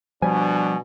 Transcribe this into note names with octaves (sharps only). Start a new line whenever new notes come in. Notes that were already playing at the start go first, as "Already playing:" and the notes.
B2 F3 G3 D4 G#5